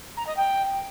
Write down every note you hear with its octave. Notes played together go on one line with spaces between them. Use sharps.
A#5
D#5
G5